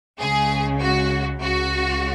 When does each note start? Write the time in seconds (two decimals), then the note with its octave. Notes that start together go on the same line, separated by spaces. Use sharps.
0.20 C#2 C#3 G#3 G#4
0.81 F#4
1.42 C#2 C#3 G#3 F#4